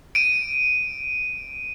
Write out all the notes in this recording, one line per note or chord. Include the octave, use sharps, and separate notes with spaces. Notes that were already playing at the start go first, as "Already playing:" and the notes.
D7 D#7